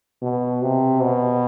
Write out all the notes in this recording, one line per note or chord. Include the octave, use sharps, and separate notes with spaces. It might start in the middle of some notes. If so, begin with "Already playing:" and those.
B2
C3
B2